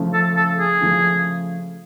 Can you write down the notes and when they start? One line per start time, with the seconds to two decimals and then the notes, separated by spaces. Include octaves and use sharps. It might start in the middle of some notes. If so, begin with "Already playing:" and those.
Already playing: C#3 F3 A3
0.13 A4
0.36 A4
0.59 G#4
0.81 C#3 F3 A3